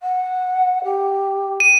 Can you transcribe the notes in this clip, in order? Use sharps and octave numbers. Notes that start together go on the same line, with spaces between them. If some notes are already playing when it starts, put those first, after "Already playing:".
F#5
G4
D#7